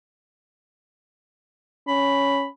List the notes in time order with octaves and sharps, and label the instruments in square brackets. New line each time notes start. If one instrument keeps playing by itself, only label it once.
[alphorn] C#4 [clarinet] B5